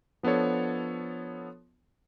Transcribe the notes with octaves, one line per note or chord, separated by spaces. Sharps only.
F3 B3 D4 A4 C#5